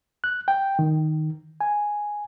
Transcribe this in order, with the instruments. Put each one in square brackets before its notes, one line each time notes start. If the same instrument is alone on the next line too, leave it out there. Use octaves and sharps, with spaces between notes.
[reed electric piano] F#6
G5
D#3
G#5